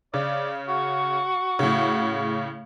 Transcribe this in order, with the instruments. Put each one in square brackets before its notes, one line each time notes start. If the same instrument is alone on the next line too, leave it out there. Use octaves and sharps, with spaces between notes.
[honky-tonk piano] C#3 [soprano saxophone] D5
[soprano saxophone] F#4 [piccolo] C#6
[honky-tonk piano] A2 C#3